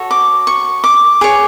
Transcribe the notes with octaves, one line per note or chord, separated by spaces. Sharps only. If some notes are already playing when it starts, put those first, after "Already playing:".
Already playing: F#4 A4 C#5
D6
C#6
D6
G#4 C#5 D6